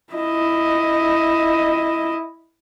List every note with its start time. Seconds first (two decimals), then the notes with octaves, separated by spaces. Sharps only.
0.13 E4 D#5